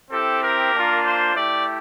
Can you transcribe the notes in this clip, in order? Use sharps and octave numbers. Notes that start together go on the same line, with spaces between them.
C4 E4 G4 A4
A#4
A#3 D4 F4
C5
A3 E4 G4 D5